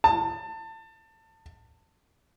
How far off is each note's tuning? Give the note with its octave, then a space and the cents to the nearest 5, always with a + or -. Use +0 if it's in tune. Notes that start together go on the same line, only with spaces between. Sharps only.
A5 +25